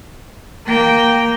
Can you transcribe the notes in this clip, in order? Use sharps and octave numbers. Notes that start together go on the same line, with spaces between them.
A#3 G5